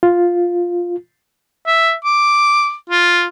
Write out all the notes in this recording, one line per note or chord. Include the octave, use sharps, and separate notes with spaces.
F4
E5
D6
F4